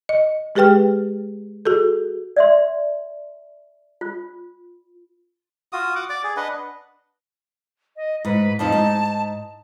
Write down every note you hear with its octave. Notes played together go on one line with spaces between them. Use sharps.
D#5
G#3 G4 G#4 B4 G5 F6
F#4 G#4 A4
D5 E5 C6
F4
F4 F#4 D#6
F#5 D6
D5 D6
G#4
D4 B4 D#5 F#5
D#5
G#2 B4
F2 F3 D#4 A5
G#2 D#4